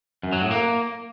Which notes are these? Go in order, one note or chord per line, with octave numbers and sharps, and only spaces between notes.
F#2
F#3
A2
A#3